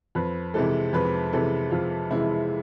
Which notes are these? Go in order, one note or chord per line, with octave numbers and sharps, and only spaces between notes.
F2 B4
C3 E3 G#3 A4
F2 B4
C3 E3 G#3 A4
F2 F4
C3 E3 G#3 E4